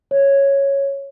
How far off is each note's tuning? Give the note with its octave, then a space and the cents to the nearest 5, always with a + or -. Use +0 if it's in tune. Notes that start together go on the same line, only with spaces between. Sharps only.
C#5 -5